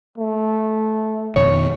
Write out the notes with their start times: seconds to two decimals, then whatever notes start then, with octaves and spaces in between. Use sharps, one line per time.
0.18 A3
1.36 F2 B2 D#3 C#5